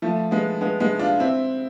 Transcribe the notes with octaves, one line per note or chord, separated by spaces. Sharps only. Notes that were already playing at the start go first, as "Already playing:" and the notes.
F3 A3
G#3 B3
G#3 B3
G#3 B3
D4 F4
C4 E4